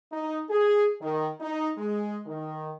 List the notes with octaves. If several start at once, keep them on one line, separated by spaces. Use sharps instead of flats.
D#4
G#4
D#3
D#4
G#3
D#3